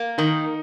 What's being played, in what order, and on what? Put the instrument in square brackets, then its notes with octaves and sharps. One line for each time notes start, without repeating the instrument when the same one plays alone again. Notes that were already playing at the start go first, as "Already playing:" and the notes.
Already playing: [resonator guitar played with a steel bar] A#3
[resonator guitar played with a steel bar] D#3 [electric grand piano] D#4